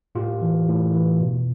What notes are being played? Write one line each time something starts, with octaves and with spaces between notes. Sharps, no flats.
A2 F4 G4
E3
A2
E3
B2